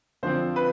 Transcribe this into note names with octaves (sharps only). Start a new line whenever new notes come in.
D3 F3 C4 C5
B4